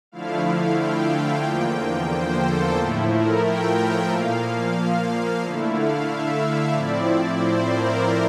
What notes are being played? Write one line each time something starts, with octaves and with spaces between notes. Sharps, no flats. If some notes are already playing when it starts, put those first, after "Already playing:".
D3 F3 A3 E4 F5
G5
E2 D3 F3 A#3 G5
C5
A4
A2 F3 A3 E4
A#4
G5
A#2 F3 A#3 F5
D3 A3 E4
F5
E5
A2 F3 C4 E4 D5
C5
A#4